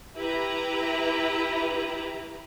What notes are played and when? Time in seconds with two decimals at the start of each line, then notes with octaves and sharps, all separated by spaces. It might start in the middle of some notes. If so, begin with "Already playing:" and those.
0.16 E4 G4 B4 A#5